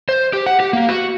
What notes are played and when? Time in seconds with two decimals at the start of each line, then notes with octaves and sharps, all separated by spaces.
0.09 C5
0.33 G4
0.46 F#5
0.60 G4
0.73 A#3
0.89 F#4